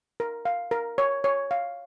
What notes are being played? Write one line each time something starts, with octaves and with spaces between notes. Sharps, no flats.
A#4
F5
A#4
C#5
C#5
F5